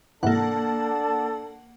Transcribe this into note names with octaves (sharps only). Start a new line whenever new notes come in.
G#2 C3 E3 A#3 D4 A4 F#5 A5